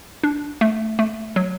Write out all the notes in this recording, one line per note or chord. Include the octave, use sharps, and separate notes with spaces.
D4
A3
A3
F#3